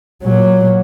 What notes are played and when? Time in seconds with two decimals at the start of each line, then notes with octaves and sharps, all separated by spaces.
0.23 A#2 F#3